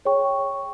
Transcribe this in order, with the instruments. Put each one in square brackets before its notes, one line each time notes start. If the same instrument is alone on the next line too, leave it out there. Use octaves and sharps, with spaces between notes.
[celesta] G#4 C#5 G5 C#6